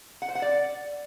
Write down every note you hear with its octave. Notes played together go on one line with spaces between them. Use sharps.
F#5
C5
F#5
D5